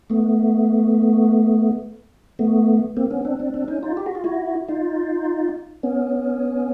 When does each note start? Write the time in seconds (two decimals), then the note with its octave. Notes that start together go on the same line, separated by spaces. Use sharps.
0.10 A3 B3
2.39 A3 B3
2.97 A#3 C4
3.11 B3 C#4
3.25 C4 D4
3.39 C4 D4
3.54 C4 D4
3.68 C#4 D#4
3.83 D#4 F4
3.97 G4
4.06 F#4
4.15 F4
4.24 E4 F#4
4.68 D#4 F4
5.83 B3 C#4